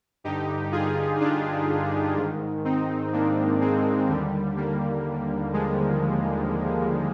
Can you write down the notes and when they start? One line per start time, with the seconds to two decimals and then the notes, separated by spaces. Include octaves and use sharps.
0.24 G2 D3 D#4 G4
0.72 F4 G#4
1.20 D4 F4
2.16 G#2 D#3
2.65 C4 D#4
3.13 A#3 D4
3.61 G#3 C4
4.09 D#2 D3 G3
4.57 G3 A#3
5.53 F3 G#3